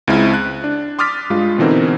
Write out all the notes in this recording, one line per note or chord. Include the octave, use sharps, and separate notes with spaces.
C#2 G#3 C4 E4 F6
F#6
D4
C6 D6 D#6 F6 A6 B6
G2 G#3 F4
B2 D3 E3 C4 D#4 A#4